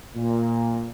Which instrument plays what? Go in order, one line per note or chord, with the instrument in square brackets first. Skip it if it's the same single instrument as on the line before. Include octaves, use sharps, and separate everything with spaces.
[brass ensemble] A#2